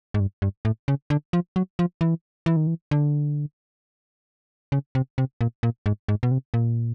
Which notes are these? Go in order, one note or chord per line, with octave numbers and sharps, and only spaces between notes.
G#2
G2
G2
A2
C#3
D3
F3
F#3
F3
E3
E3
D#3
E3
D3
C#3
C3
C3
A#2
A#2
G#2
G#2
B2
C3
A#2